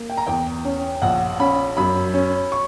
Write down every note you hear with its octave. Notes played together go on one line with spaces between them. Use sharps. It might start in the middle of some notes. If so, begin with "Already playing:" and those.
Already playing: A#3
G5
A#5
E2 G5
C#4
A#1 F#5
C#4 B5
F#2 B5
C#4
C#6